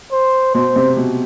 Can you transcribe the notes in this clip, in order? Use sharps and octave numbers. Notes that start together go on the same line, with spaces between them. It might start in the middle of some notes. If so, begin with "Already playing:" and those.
C5
B2 C5
C3
B2